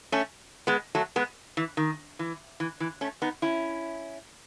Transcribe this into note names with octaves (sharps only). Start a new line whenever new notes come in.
A3 C#4
G#3 B3
F#3 A3
G#3 B3
E3
D#3
E3
E3
E3
A3 C#4
B3 D#4
C#4 E4